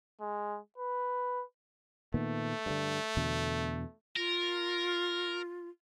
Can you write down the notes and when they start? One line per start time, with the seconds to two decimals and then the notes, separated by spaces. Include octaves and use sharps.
0.21 G#3
0.77 B4
2.14 A#2 D#3 A3 B3
2.66 G2 D3
3.17 E2 B2 D3
4.16 F4 A#4